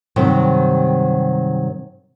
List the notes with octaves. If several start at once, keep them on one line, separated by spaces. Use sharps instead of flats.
G2 C3 D#3 F#3 C5